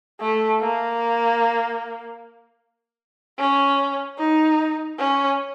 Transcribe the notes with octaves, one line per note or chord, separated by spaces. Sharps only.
A3
A#3
C#4
D#4
C#4